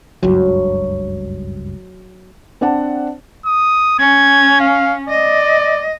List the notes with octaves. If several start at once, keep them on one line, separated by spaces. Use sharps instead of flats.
F#1 C#2 G2 F#3
C4 D4 C5 D5 F#5 A5
D#6
C#4 G#6
F5
D5 D#5